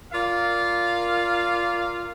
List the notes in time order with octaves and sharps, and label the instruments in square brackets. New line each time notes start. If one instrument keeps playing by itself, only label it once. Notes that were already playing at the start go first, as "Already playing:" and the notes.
[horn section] F4 A#4 D5 F5